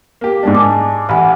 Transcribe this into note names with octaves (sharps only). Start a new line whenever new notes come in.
A#3 G4
G#2 G#3 D4
G#5 A5 D6
A1 F#5 G#5 B5